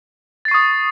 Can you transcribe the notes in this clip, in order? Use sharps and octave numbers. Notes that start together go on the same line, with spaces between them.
C#6 D#6 A6 C7